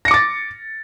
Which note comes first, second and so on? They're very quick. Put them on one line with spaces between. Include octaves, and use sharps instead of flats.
A#6 C#7 D6 A6